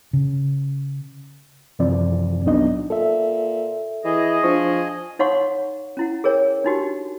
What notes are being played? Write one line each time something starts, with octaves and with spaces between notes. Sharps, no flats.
C#3
F#2 C3 E3 F3 C4 D5
C2 F#3 B3 D4 D#4 D#5
A#2 A4 E5
E3 G#4 D#5
F3 D4 C5 C#6
D#4 C#5 F5 F#5 C6 C#6
C#4 E4 F#5
G#4 A#4 C#5 G5
D4 D#4 F#4 G4